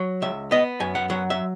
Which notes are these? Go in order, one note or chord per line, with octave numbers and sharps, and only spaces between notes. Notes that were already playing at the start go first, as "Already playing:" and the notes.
Already playing: F#3
C#2 E5
B3 D#5
F#2 G#5
F#5
F#3 F#5
E5